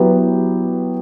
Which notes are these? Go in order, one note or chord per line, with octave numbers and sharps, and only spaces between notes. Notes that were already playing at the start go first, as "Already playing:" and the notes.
Already playing: F#3 B3 E4 G4 B4